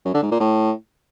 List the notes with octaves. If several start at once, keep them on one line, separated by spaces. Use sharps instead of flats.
F#2
D3
G#2
A#2
A2